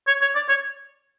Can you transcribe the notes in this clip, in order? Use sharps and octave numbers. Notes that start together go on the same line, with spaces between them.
C#5
C#5
D5
C#5